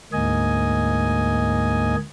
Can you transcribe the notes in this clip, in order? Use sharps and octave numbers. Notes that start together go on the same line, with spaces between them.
D2 G#2 A#3 D#5 G#5